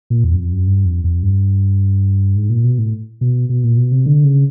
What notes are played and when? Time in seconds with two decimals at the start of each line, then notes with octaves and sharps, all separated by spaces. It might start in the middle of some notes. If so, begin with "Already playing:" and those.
0.10 A#2
0.24 E2
0.34 F#2
0.38 F2
0.52 F#2
0.67 G2
0.85 F2
1.04 F2
1.23 G2
2.36 G#2
2.50 A#2
2.64 B2
2.78 A2
3.21 B2
3.49 B2
3.64 A#2
3.77 B2
3.92 C3
4.06 D3
4.24 C#3